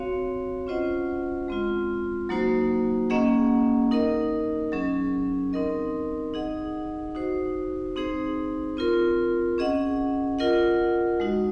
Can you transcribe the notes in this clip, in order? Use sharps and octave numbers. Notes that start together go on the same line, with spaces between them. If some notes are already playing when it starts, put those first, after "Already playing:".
Already playing: C4 F#4 C#5 F5
C#4 F4 C5 D#5 F#5
G#3 C4 F4
F#3 A#3 D#4 F#4 C5
A#3 C#4 G#4 D#5 F#5
D#4 A#4 D#5
F#3 C#4 G#4
C4 D#4 A#4 D#5
D#4 G#4 D#5 F#5
D#4 F#4 C5
C4 D#4 G#4 C5
C4 F4 A#4
C#4 G#4 D#5 F#5
F4 A#4 D#5 F#5
G#3 D#4 F#4